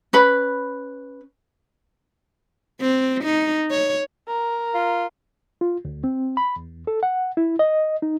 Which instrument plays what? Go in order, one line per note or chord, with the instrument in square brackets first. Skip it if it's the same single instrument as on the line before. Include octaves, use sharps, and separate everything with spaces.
[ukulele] C#4 B4 B5
[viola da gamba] C4
D#4
C#5
[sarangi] A#4
[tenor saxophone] F4
[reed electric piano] F4
D2
C4
B5
E2
A4
F#5
E4
D#5
D#4